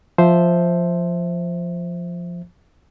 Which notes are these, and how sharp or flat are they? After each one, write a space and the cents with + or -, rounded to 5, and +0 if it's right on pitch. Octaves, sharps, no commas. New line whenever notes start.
F3 +0 C5 +0 E5 +0